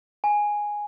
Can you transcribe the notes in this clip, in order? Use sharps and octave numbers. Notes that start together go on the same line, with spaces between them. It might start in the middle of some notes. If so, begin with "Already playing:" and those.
G#5